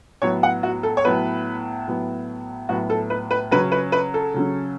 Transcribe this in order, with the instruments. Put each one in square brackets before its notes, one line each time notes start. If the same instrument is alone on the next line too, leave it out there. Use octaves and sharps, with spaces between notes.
[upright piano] A2 F#3 B3 C#5
F#5
F#4
A4
C#5
A2 F#3 B3 B4
A2 F#3 B3
A2 F#3 B3 F#4
A4
B4
B4
C#3 F#3 C#4 B4
B4
B4
A4
C#3 F#3 C#4